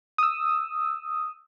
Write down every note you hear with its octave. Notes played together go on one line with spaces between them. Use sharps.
D#6 E6